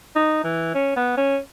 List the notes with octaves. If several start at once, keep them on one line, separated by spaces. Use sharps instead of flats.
D#4
E3
C#4
B3
C#4